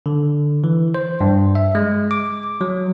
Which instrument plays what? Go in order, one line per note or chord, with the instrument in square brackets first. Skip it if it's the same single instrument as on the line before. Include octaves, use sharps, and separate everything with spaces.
[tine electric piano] D3
E3
C5
G2
E5
G#3
D6
F#3